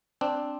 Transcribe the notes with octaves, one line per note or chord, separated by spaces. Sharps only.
C4 D4